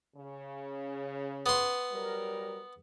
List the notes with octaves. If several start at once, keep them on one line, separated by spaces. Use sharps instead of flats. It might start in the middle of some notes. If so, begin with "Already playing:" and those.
C#3
B3 C6
F#3 G3 A#4